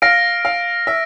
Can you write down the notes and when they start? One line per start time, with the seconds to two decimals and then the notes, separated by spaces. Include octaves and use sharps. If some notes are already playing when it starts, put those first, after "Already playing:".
0.02 F5 F6 A#6 D7
0.45 F5
0.87 E5